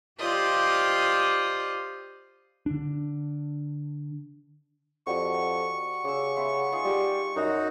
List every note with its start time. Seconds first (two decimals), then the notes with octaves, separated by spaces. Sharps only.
0.19 F4 G4 C5 D5 D#5
2.66 D3 D4
5.07 F2 G3 F#4 C#6
6.04 C#3 D6 E6
6.36 B3 C5 E5
6.72 D#4 F4 G#4
6.85 G3 F4 C5
7.36 F#2 D#4 F#4 F#5 A#5